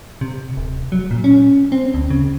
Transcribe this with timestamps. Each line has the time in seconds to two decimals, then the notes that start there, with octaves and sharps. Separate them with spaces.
0.21 C3
0.57 D1
0.92 F#3
1.11 A#2
1.24 C#4
1.72 C4
1.94 D2
2.10 C#3